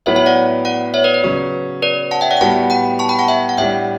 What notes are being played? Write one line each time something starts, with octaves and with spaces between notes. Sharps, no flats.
A2 F#3 B3 E4 B4 C#5 E5
C#5 E5
D5 F#5
D5 F#5
C#5 E5
B4 D5
B4
C#3 F#3 C#4
B4 D5
F#5 A5
E5 G5
D5 F#5
G5
A2 G3 B3 F#4 F#5 A5
G5 B5
A5 C#6
G5 B5
F#5 A5
E5 G5
F#5
A2 G3 D4 E5 G5